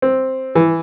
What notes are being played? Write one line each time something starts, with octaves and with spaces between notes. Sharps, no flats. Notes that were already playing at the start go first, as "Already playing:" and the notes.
C4
E3